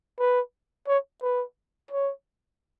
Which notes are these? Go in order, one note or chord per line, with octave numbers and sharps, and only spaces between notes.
B4
C#5
B4
C#5